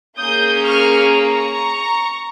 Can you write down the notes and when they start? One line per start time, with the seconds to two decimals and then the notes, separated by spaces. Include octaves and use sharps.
0.19 A#3 C#4 G#4 D#6 G6
0.65 C#6 F6
1.12 A#5 C#6